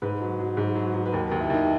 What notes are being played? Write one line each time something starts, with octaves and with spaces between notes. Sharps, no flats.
G#2 B4
F#3
F#3
G#2
F#3
F#3
B4
D#2 A#4
D#2 A#4
E4
D#2 D#4